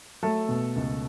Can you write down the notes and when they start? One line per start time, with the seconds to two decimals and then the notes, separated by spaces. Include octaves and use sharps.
0.23 F#3 A3 A4
0.49 B2
0.76 C#2